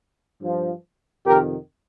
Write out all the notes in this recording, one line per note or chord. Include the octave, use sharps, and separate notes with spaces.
G2 F3
F2 C3 D#3 G4 A#4